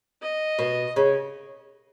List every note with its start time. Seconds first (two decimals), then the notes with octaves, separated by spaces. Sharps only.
0.22 D#5
0.59 B2
0.96 C#3